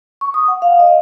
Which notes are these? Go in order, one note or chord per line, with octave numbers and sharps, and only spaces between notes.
C#6
D#6
F#5
F5
D#5